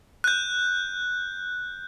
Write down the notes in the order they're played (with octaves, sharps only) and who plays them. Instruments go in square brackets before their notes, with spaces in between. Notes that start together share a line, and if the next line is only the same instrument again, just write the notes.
[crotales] F#6 G6